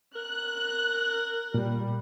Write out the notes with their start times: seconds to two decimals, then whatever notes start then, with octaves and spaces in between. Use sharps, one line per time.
0.16 A#4 F#6
1.54 A#2 G3